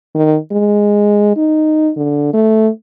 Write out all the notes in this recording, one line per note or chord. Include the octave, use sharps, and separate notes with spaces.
D#3
G#3
D#4
D3
A3